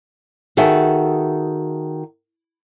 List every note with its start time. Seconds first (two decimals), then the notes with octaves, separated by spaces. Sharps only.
0.57 D#3 F#4 G#4 A4 E5